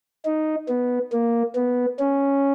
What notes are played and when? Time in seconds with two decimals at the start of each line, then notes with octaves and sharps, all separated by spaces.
0.25 D#4
0.69 B3
1.12 A#3
1.56 B3
1.99 C#4